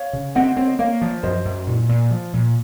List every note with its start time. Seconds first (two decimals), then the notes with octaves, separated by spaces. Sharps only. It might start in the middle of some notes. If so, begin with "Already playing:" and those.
Already playing: C#5 F5
0.13 C#3
0.35 C4 D#5 F#5
0.56 C4 C#5
0.67 D#5
0.79 A#3 C#5 F5
1.02 F3
1.23 F#2 C5 D#5
1.45 F#2
1.67 A#2
1.89 A#2
2.11 F3
2.33 A#2